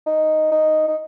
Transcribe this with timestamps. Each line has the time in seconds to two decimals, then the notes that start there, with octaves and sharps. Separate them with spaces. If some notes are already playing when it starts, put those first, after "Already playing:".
0.07 D#4
0.51 D#4
0.88 D#4